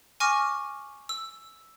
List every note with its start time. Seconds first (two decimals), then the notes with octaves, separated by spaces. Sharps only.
0.20 G#5 C#6 D6 F6 A#6
1.09 E6